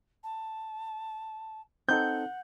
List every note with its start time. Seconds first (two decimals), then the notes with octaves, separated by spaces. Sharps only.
0.24 A5
1.88 C4 D#4 A4 F#5 G6